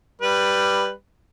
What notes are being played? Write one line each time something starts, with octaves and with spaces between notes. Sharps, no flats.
G3 B4